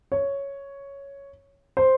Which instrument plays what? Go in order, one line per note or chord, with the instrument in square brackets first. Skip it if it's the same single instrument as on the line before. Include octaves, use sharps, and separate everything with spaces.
[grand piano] C#5
C5